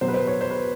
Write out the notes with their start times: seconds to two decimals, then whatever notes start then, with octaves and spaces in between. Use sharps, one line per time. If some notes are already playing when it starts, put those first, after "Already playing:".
0.01 B2 F#3 C5
0.08 B4
0.14 C5
0.27 C#5
0.41 C5
0.51 B4